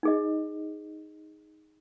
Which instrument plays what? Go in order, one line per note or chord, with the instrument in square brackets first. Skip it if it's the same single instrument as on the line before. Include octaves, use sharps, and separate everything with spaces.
[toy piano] D#4 G#4 D#5